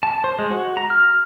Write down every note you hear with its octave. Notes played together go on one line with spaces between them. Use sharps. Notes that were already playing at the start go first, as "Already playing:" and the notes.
A5
C5
G#3
F#4
A#5
F6